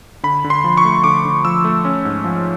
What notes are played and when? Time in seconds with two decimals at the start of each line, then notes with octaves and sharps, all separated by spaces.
0.23 D3 B5
0.44 D3
0.50 C6
0.64 F3
0.77 C#6
0.85 A3
1.04 D3 D6
1.25 D3
1.45 F3 E6
1.64 A3
1.85 C#4
2.05 G#2
2.24 F3